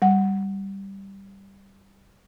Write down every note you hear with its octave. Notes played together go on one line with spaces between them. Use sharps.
G3 F#5